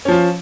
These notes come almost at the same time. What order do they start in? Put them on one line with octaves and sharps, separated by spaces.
C#4 F3 F4